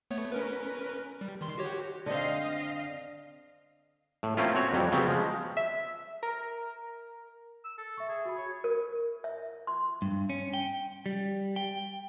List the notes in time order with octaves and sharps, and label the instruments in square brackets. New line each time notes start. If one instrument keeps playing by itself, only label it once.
[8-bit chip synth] A3 B3 C#5
C#4 A#4 B4
G3
D#3 C6
F#4 G4 C#5
[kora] D3 C4 [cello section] D#5 F5
[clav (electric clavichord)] A2
A3 A#3 C4 C#4 E4 F4
C4 F#4 C#5 F#5
F2 F#3 G3
C#3 F#3 B3 C4
F3 G#3
[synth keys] E5
A#4
[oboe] E6
A4
[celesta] E5 C#6
[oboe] G#4
[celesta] F#4 B5
[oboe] C#5
[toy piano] A#4
E5
C6
[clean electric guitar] G2
C#4
G5
G3
G5